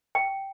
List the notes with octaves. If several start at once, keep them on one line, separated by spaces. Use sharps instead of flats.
G5